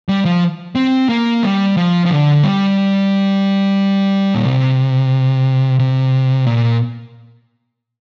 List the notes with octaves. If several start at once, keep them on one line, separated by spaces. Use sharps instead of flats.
G3
F3
C4
A#3
G3
F3
F3
D3
G3
A#2
C3
C3
A#2